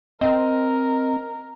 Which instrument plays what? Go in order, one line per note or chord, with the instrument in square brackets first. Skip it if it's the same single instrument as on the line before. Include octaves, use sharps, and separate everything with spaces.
[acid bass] C4 [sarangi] A#4 [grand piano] D#5